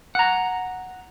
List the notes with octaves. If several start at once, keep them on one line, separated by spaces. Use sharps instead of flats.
F#5 A#5